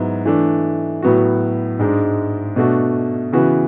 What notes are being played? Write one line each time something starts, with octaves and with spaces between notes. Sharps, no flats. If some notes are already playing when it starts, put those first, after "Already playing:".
Already playing: G#2 F#3 B3 E4
E3 A3 D4
A2 F#3 B3 F#4
G#2 G#3 D4
B2 A3 D4 F#4
C#3 E3 B3 F#4